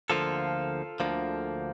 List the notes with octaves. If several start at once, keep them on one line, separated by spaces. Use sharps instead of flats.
D2 D3 F3 A#3 F4 A4
D2 D3 F3 A#3